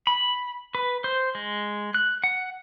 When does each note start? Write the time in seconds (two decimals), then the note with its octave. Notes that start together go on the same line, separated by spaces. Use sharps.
0.07 B5
0.75 B4
1.04 C5
1.35 G#3
1.94 F#6
2.24 F#5